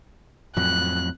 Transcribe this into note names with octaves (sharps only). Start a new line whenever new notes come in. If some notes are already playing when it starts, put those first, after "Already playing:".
F2 A2 F#3 F#6